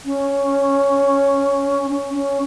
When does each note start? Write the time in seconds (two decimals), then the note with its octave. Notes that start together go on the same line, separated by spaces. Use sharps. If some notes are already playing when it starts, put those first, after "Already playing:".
0.05 C#4
1.90 C#4
2.14 C#4